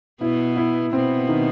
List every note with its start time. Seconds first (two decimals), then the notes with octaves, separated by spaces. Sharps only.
0.21 B2 B3 E4
0.57 E4
0.92 B2 B3 C4
1.29 D#3